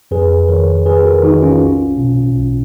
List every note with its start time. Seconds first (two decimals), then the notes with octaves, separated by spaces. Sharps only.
0.11 F2 G#4 B4
0.48 D#3 A#4 C#5
0.86 F2 G#4 B4
1.05 F#4 A#4
1.23 D#3 D#4 F#4
1.42 C#4 F4
1.61 B1
1.98 B2
2.36 B1